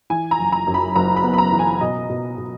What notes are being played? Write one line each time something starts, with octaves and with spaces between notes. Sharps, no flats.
E3 G#5
A#5
F#1
A#5
F#2
B5
F#1 A#5
B5
B3
B5
A#5
E3
G#5
B2 D#5
B2
B2